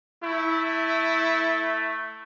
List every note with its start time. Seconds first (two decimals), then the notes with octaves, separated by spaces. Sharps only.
0.24 A3 E4